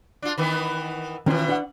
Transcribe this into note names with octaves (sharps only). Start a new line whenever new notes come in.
D4 F4
D#3 E3 B3
B2 D#3 E3 C#4 F4
D4 F#5